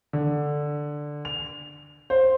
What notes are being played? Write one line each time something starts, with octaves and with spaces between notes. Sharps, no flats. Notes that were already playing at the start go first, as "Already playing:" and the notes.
D3
F7
C5